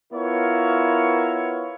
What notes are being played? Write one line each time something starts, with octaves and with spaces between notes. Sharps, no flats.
B3 E4 F4 A#4 C#5